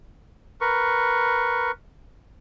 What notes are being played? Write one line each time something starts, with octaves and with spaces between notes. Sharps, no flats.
A#4 B4 C#6